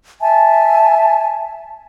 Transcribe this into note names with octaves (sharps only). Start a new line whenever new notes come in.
E5 G#5 A5